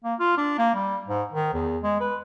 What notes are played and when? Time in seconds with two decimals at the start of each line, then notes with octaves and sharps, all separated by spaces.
0.04 A#3
0.19 F4
0.37 D4
0.58 A#3
0.74 G3
1.07 G#2
1.33 D#3
1.54 E2
1.83 G#3
2.01 B4